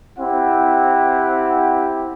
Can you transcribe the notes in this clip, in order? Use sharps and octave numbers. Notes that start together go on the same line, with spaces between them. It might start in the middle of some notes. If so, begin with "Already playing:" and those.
C4 E4 G4 F#5